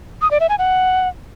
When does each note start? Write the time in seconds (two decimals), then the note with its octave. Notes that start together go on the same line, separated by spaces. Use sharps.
0.22 D#6
0.31 D5
0.40 E5
0.49 G#5
0.59 F#5